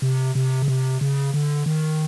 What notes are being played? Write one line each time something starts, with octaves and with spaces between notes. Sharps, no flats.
C3
C3
C#3
C3
C#3
D3
D#3